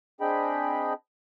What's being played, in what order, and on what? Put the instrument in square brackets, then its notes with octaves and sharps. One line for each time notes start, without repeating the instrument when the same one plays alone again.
[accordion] C4 D4 G#4 D#5 G5 B5